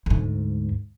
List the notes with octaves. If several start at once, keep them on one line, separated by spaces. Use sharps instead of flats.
D2 G#2